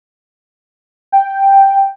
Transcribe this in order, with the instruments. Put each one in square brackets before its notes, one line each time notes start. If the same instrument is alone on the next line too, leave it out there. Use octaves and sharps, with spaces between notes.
[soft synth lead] G5